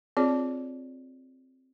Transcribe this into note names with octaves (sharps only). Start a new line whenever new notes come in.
C4 F4 G#4 C#5 D5